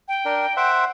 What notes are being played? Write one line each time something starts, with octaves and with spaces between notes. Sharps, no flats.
G5
D4 A#4
C5 E5 F#5